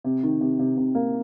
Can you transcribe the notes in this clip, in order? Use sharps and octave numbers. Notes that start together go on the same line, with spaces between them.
C3
D#3
C3
C3
C3
A#3